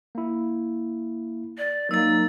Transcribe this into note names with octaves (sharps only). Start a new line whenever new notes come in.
A#3 E4
D5
F#3 A#3 D#4 E6 A6